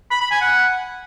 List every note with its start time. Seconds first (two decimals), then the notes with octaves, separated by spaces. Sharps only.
0.11 B5
0.21 B5
0.31 G#5
0.41 F#5